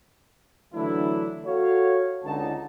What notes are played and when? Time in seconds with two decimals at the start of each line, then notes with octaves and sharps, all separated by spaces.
0.74 D3 E3 F#3 A3 D4 E4
1.45 F#4 A4 C#5 F5
2.24 C#2 D3 D#4 A5